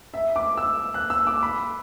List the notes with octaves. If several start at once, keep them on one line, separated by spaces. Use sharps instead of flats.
E5
D6
E6
F#6
E6
D6
B5